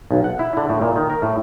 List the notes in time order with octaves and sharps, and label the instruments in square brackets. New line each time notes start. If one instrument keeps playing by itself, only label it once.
[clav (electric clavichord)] B1
F#5
E4
D3
A2
A#2
D#3
A#4
A2